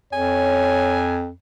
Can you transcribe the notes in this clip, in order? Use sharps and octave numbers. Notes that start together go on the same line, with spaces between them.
F2 C#5 G#5